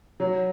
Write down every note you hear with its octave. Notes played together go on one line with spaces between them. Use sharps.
F#3